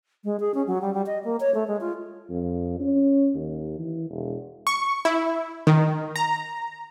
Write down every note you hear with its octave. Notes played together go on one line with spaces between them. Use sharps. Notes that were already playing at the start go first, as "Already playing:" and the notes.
G#3
G#4
C#4
F#3
G3
G3
D#5
A#3
C#5
A3
G#3
F4
F2
C#4
D#2
E3
E1
C#6
E4
D#3
A#5